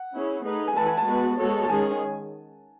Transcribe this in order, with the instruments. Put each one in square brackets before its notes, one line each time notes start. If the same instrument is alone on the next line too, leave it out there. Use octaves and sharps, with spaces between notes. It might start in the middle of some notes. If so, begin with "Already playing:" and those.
Already playing: [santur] F#5
[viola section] C#4 E4 G#4
A3 D#4 G#4 B4
[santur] G#5
[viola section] E3 A3 E4 B4 [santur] A5
[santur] G#5
A5
[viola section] G#3 B3 F#4 B4
G#3 B3 F#4 A4 C#5
[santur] A5
[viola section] D#3 G#3 C#4 G#4 [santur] G#5